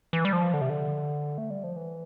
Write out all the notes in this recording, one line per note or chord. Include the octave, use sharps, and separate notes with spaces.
E3
G3
F3
D3
C3
D3
A3
G3
F3
E3